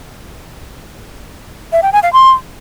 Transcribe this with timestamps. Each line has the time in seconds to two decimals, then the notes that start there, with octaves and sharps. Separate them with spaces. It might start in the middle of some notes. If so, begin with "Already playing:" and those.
1.72 E5
1.82 G5
1.93 G#5
2.03 F5
2.13 C6